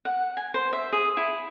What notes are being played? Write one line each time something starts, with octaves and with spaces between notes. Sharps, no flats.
F#5
G#5
C5
E5
G#4
E4